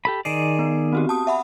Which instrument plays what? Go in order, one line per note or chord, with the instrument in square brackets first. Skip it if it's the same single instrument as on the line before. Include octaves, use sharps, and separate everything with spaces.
[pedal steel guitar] G4 A4 B5
[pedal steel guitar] D#3 G#4 D5 [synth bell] C7 D7 E7
[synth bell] B3
C4 F#4 G4
A5 D#6
E5 F#5 B5